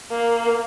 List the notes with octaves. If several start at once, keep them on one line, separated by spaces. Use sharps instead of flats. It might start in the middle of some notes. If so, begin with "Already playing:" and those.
A#3